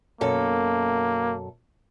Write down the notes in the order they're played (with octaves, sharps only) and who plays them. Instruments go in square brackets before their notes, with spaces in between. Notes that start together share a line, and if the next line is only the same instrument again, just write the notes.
[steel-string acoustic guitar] F#2 B2 A4 [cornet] A#3